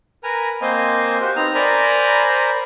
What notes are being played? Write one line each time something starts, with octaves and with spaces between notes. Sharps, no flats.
A#4 B4 G#5 A#5
A#3 C4 C5 D#5 F5 G#5
F#4 G4 C5
B3 C4 D#4 A#5 F6
A#4 C5 D5 G#5 A#5 B5